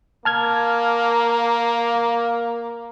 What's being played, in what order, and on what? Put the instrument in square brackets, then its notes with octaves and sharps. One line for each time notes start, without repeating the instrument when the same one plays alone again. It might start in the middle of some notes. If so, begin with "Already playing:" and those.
[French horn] A#3 [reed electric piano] A5 F6 G#6